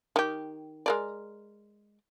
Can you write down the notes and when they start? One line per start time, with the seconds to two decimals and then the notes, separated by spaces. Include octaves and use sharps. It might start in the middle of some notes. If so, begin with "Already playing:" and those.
0.16 D#3 G4
0.86 G#3 A#4 D5